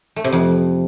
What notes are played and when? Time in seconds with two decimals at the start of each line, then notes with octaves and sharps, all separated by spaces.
0.16 A3
0.24 C3
0.32 F2